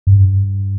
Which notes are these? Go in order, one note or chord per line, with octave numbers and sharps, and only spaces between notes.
G2